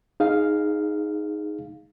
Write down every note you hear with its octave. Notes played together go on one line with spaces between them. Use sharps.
D#4 G#4 F5